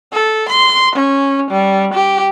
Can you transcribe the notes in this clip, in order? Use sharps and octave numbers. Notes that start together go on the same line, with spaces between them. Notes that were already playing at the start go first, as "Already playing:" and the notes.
A4
C6
C#4
G3
G4